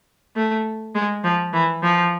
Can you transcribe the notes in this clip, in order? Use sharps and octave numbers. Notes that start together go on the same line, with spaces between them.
A3
G#3
F3
E3
F3